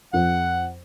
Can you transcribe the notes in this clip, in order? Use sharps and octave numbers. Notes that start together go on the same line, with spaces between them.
F2 F#5